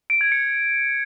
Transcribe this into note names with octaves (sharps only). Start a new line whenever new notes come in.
D7
G#6
C#7